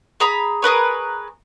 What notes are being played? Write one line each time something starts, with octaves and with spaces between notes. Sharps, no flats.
G#4 A#5 B5
G#4 A#4 B4 C#5